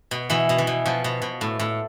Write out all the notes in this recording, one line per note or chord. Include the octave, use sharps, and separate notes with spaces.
B2
B2 E3
B2
E3
B2
B2 F3
B2
B2
A2
A2